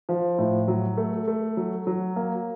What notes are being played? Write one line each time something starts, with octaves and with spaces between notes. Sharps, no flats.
F3
A2
F#3
A3
A3
F#3
F#3
A#3